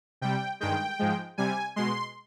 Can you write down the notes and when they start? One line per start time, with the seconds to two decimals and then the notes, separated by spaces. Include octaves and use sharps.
0.21 C3 G3 G5
0.60 G2 D#3 G#3 G5
0.99 G#2 F3 G#3
1.38 C3 G3 G#5
1.76 B2 G#3 C6